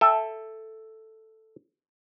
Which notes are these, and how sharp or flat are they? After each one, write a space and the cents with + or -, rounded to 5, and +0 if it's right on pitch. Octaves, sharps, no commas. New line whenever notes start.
A4 +0 E5 +0 G5 +40